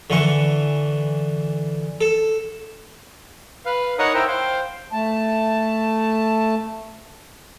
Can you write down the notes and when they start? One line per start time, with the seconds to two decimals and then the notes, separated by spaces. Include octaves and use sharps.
0.10 D3 E3 C#6
2.01 A4
3.66 B4 F5
3.99 D#4 A#4 C#5 F#5 C#6 D#6
4.14 E4 A#4 C5 E5 G5
4.28 C5 F5 G5
4.92 A3 A5